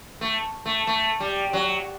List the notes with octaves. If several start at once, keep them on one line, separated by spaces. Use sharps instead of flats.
A3
A3
A3
G3
F#3